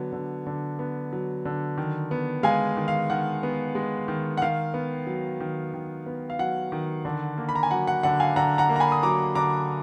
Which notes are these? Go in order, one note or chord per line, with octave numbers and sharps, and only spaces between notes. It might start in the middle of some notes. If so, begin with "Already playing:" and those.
Already playing: D3 F#3 B3
D3
D3
B3
F#3
D3
D#3
B3
G#3 F5 G#5
D#3
F5
D#3 F#5
B3
G#3
D#3
F#5
D#3 F5
B3
F#3
D#3
D#3
B3
F5
F#3 F#5
D#3
D3
A#3
B5
A#5
G#5
F#3 F#5
F#5
D3 F#5
F5 G#5
D3 F#5 A#5
F#5 A#5
A#3
A#5
G#5 B5
D#6
F#3 A#5 D6
D3 A#5 D6